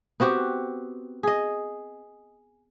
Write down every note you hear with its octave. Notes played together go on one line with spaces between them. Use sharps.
B3 C4 F#4 G4
G#4 D#5